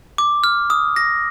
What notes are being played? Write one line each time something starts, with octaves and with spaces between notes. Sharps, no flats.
D6
F6
D#6
A#6